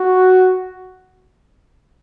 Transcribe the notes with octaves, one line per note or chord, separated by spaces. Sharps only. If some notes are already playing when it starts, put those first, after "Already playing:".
Already playing: F#4